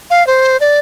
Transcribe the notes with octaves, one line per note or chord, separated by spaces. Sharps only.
F5
C5
D5